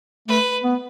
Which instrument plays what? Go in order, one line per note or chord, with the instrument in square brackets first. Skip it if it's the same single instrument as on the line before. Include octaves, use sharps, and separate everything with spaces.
[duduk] A3 [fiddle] B4
[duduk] B3